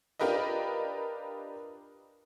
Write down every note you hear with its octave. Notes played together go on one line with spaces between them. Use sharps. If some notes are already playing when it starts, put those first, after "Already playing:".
D4 F4 G4 A#4 B4 D#5